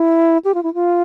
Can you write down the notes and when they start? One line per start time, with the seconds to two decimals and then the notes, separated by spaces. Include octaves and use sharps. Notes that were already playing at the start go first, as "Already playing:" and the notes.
Already playing: E4
0.45 G4
0.54 F4
0.63 E4
0.74 F4